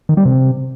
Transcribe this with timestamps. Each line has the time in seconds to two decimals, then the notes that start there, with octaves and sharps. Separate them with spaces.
0.09 D#3
0.17 G3
0.25 C3